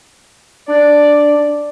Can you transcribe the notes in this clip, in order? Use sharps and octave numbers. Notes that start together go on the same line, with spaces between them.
D4 D5